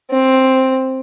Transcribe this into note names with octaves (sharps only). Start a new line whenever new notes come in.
C4